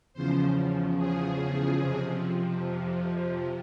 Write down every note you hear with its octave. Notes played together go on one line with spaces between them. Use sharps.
E2 C#3 F3 C5
G#4
F2 C3 F3